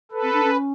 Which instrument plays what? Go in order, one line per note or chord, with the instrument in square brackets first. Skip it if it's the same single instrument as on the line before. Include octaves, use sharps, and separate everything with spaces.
[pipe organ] A4 B4
[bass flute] C4
D4
C#4